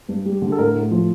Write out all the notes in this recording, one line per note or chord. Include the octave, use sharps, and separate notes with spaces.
G2
G3
D3
A4
A2 A#4
A2
F3